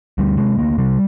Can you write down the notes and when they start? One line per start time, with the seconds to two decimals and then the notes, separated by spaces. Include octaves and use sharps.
0.18 D2 G3
0.38 C3 G#3
0.58 D2 A#3
0.78 C3 G3